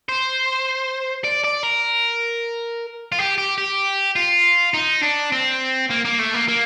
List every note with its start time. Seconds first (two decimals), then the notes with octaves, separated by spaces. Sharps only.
0.09 C5
1.24 D5
1.44 D5
1.63 A#4
3.12 F4
3.19 G4
3.38 G4
3.58 G4
4.16 F4
4.74 D#4
5.02 D4
5.32 C4
5.90 A#3
6.05 A#3
6.19 A3
6.34 A#3
6.48 A#3